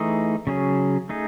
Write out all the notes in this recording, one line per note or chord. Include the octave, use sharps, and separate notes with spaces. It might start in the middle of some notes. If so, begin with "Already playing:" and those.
Already playing: E3 A3 D#4 G#4
C#3 F#3 C#4 G#4
A3 D#4 G#4